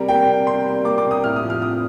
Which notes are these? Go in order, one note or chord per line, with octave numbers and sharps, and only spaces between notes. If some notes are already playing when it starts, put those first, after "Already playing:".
Already playing: C3 G3 A#4
A#3 G5
C3
C3 C6
G3
A#3 D6
D6
C3
D#6
A2 F6
D#6
F3
F6
C4 D#6